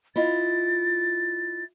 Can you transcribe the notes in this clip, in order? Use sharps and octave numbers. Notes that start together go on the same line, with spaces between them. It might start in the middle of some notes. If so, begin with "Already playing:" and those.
E4 F4 D#5 A6